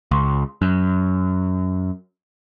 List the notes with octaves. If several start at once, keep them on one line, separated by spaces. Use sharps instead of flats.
C#2
F#2